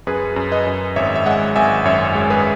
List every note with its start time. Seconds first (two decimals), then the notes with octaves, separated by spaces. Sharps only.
0.07 F#2 G#4 B4
0.36 F#2
0.52 B4 D#5
0.66 F#2
0.96 G#1 C#5 E5
1.15 E5
1.26 G#3 D#5 F#5
1.56 G#1 E5 G#5
1.85 F#2 C#5 E5
2.15 G#3
2.30 G#4 B4